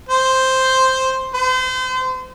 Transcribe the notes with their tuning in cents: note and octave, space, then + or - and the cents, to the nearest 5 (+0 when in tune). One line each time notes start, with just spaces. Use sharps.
C5 +0
C5 -35